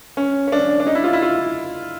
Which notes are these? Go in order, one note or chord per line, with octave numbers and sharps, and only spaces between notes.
C#4
C#4
D4
D4
D#4
E4
F4
E4
F4